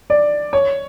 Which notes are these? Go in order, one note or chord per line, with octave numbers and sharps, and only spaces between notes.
D5
C#5